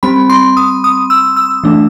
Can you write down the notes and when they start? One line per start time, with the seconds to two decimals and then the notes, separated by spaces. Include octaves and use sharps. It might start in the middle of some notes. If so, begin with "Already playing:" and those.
0.03 G3 C4 B5
0.30 C6
0.57 D#6
0.84 D#6
1.10 E6
1.36 E6
1.64 E3 A3 D4